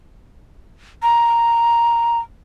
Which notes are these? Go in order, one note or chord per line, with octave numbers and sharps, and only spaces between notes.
A#5